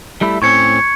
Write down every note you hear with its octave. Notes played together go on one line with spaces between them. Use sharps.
G3 A3 E4
A2 C4 C#4 C#6 G#6 C#7